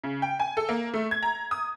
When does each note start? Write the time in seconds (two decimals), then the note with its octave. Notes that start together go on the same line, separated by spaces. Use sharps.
0.04 C#3
0.22 G5
0.40 G#5
0.57 A4
0.69 A#3
0.94 A3
1.11 G#6
1.23 A#5
1.51 D#6